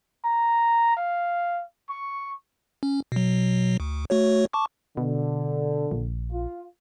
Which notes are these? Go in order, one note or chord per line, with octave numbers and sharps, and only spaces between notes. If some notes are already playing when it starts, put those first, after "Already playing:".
A#5
F5
C#6
C#4
B2 F#3
D2
A3 F#4 C#5
A5 C#6 D6
B2 D3
A#1
F4